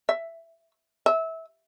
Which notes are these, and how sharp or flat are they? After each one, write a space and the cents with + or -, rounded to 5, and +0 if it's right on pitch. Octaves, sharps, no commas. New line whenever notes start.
E5 +10
E5 -20